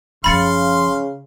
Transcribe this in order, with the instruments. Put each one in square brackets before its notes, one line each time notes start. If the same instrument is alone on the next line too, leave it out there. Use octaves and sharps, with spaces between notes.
[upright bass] F#1 F3 [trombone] C#3 [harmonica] F5 C6 [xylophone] B5 A6 C#7